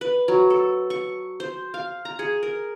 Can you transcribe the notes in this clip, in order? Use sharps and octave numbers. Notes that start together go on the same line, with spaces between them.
B4
F#3
A4
C#6
C5
F5
A#5
G#4
A#4